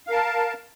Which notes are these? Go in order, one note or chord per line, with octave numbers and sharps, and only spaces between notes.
A#4 F5 A5